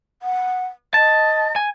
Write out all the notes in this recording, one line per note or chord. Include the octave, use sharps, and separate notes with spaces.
F#5
D#5 A5
G#5